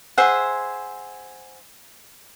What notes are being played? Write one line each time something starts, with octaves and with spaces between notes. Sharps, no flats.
G#4 C5 E5 F#5